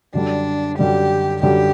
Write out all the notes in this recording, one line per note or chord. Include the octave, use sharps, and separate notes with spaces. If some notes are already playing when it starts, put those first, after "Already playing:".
F#2 D3 G3 D4
F#2 D3 G3 G4
F#2 D3 G3 G4